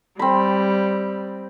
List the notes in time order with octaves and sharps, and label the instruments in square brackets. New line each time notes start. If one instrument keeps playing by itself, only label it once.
[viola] G3 [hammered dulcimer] C4 B5